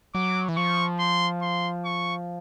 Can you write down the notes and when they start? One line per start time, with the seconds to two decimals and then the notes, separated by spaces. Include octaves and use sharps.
0.15 F#3 D6
0.49 E3
0.57 F3 C#6
0.99 C6
1.42 C6
1.85 C#6